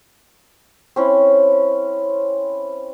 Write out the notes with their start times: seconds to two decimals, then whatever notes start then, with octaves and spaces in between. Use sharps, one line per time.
0.96 C4 C#4 E4